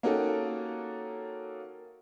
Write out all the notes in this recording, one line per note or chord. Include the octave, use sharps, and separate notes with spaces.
A#3 C#4 D#4 F#4 G4 A4